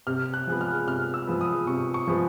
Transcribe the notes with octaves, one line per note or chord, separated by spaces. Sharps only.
C3 F6
F#6
F3 G#3 B3
F6
C3 F6
E6
F3 G#3 B3
D#6
C3 C#6
C#6
F3 G#3 B3